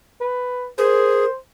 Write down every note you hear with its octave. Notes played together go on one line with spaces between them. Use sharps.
B4
G#4 A#4 C5